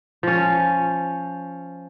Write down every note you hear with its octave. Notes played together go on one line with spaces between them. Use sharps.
F3 C#4